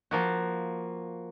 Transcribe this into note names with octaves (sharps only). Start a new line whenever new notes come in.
F3 A#3 F#4